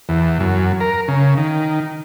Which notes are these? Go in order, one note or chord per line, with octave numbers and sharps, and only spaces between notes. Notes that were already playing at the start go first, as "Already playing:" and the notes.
E2
F#2
A#4
C#3
D#3